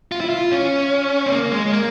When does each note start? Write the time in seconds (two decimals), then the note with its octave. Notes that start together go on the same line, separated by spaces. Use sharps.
0.12 F4
0.21 E4
0.29 F4
0.51 C#4
1.26 C4
1.32 A#3
1.52 G#3
1.72 A#3